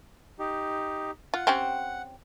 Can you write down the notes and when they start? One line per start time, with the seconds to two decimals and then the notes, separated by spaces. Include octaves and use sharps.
0.39 D#4 G4
1.34 F4 F#5
1.47 C4 C#4 G4